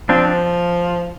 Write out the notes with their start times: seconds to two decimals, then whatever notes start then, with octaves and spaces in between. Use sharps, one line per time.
0.09 F3 C4 D4